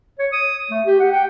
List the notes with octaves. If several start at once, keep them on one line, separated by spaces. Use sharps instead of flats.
C#5
D#6
A3
G4
F#5
G5